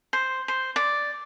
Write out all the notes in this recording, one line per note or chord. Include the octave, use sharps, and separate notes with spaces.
C5
C5
D5